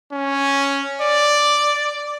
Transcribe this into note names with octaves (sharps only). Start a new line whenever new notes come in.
C#4
D5